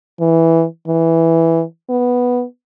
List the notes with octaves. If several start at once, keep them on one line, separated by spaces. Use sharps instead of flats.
E3
E3
B3